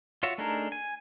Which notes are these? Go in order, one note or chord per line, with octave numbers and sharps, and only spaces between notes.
F4 F#4 C#5 E5
A3 D4 D#4 G#4 A#4
G#5